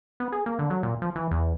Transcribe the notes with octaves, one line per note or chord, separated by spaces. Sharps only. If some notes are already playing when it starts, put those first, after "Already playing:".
B3
G#4
A#3
D3
F#3
A#2
F3
E3
E2